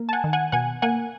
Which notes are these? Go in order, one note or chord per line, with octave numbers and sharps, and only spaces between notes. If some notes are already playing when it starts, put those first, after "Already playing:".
Already playing: A#3
A5
F#5 G#5
D#3
F#5 G#5
B2 F#5 G#5
A#3 F#5 G#5